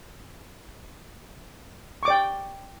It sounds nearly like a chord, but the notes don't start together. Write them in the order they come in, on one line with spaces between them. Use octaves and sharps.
C#6 D6 D5 G5